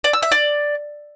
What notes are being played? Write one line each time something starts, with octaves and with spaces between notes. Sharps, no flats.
D5
E6
E5
D5